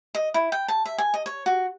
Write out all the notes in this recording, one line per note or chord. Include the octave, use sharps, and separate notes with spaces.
D#5
E4
G5
A5
E5
G#5
D#5
C#5
F#4